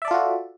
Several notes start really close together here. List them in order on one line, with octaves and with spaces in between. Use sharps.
E5 D5 A4 F4 F#4